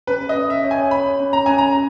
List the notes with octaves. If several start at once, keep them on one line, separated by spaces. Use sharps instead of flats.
C#4 B4
D#5
C#4
E5
C#5
G#5
C#5 B5
C#4
A#5
C#4 G#5
A#5